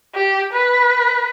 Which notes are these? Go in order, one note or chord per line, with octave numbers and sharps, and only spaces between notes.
G4
B4